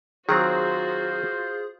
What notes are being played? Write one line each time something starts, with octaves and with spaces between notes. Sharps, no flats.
D#3 F#3 C4 F4 F#4 G#4 C5